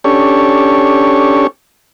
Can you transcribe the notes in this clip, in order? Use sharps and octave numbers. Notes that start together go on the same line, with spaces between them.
C#4 D4 G4 A4 C#5